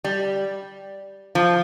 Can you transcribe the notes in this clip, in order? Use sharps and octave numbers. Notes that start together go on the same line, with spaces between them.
G3
F3